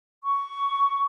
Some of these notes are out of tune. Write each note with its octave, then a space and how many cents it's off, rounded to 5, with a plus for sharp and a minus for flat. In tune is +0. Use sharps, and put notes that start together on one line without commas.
C#6 +15